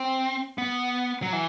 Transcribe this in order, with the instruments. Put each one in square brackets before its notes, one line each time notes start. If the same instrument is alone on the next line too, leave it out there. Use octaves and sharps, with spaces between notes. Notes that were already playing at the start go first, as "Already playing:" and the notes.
Already playing: [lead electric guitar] C4
B3
F#3
E3